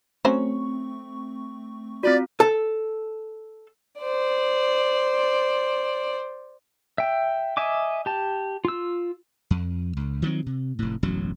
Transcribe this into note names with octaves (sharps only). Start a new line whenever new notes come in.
F#3 A3 C4 C#4 C5 C#6
C4 F4 F#4 D5
A4 A5
C5 D5
E5 G5
D#5 E5 G#5 D6
G4 A5
F4 E6
F2
C#2
D#3 F3 F#3 C4
C3
F1 A2
E1 A1 F#2 F#3